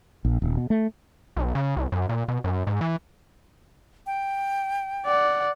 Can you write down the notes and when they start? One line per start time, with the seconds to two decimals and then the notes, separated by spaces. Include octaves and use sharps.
0.25 A#1
0.42 D#1
0.57 B2
0.70 A3
1.36 B1
1.55 C#3
1.76 C2
1.92 F#2
2.09 A#2
2.28 B2
2.44 F#2
2.67 G#2
2.81 E3
4.06 G5
5.05 D5 F#5